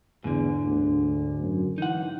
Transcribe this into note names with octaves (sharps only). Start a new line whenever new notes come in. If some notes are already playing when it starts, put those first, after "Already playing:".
E2 G#2 D3
D2
F#2
E3 D#4 F#5